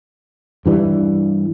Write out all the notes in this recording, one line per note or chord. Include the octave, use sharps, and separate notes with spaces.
G2 E3 G3